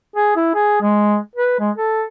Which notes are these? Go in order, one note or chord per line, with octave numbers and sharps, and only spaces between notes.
G#4
E4
G#4
G#3
B4
G#3
A4